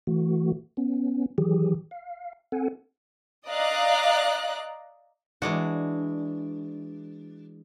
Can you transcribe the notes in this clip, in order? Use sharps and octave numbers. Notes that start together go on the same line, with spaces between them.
E3 A3 F#4
B3 C#4
D#3 E3 F#3 G4 G#4
F5
C4 A4 F#5 G#5
D5 D#5 F5 A#5 F#6
E3 G#3 D4 F#4